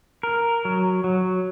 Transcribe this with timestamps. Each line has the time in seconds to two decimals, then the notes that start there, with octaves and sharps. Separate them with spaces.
0.23 A#4
0.65 F#3
1.04 F#3